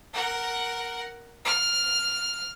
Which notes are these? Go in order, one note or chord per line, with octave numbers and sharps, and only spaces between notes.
A#4 F#5
F6